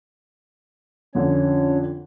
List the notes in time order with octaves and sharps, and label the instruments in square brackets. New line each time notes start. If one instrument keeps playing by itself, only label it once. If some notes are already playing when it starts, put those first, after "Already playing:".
[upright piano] F2 D3 [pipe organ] C#4 C#5